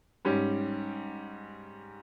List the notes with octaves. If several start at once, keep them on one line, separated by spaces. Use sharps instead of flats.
G#2 G3 C#4 G4